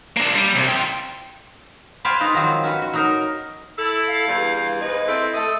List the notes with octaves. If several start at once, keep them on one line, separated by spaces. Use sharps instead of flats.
A#3 D4
G3
C2
F4 G5
B4 C5 D5 F5 G5 G#5
G#3 D#4 F4 B4
D#3 F3 F#3 C4
C#4 F#4 B4
F#4
F#3 D#4 A#4
E4 A4 E6
F5
E2 G2
G#2 G#3 B4 D#5
C4 E4 A4
A3 A4 E5 D#6